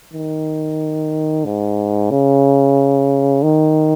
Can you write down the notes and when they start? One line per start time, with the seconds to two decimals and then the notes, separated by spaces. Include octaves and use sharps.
0.13 D#3
1.45 G#2
2.10 C#3
3.43 D#3